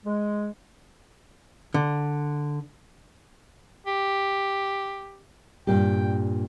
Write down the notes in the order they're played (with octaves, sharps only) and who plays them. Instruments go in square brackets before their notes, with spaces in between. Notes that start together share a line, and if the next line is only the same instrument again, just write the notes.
[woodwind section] G#3
[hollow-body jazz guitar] D3
[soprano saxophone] G4
[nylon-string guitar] G2 A#2 G4 [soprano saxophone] G5